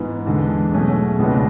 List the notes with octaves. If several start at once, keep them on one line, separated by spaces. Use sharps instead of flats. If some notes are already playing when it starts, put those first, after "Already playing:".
Already playing: G#2 E3 B3
E2 D3 G#3
B2 F#3 A3 C#4 G#4
C#2 B2 G#3 B3 D4